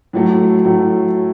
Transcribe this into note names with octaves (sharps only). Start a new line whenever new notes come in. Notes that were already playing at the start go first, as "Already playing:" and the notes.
A2 F#3 A3
A2 F#3 A3